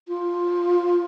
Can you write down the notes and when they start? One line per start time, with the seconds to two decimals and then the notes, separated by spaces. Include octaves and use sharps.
0.08 F4